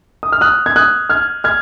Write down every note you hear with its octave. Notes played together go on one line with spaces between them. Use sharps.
D#6
F6
D#6 F#6
G#6
D#6 F#6
F6 G#6
F6 G#6